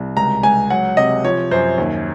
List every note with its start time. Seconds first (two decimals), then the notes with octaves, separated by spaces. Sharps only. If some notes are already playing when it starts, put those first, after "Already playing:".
Already playing: C2
0.16 C#2 A#5
0.43 C#2 G#5
0.70 F#3 F#5
0.97 C3 D#5
1.24 F3 C#5
1.51 F#2 C5
1.78 D#2